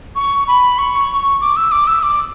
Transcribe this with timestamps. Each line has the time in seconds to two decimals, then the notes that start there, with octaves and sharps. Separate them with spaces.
0.15 C#6
0.48 B5
0.78 C#6
1.41 D6
1.56 E6
1.71 D6
1.87 E6
2.03 D6